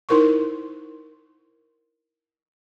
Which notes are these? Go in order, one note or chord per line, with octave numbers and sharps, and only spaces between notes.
D#4 E4 A#4 C5 C#6